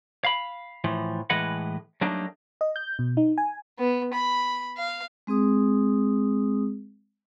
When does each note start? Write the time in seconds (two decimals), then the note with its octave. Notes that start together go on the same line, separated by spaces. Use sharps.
0.25 F5 B5
0.84 A2 E3 F3
1.30 A2 E3 G#3 B4 D#5 F#5
2.01 F#3 G3 A3 A#3 D4 D#4
2.61 D#5
2.76 G6
2.99 B2
3.17 D#4
3.38 G#5
3.79 B3
4.14 B5
4.77 F5
5.27 G#3 C4 G#4 D#6